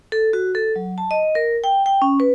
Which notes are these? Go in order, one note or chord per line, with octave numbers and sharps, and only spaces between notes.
A4
F#4
A4
F#3
A5
D#5
A#4
G5
G5
C#4
B4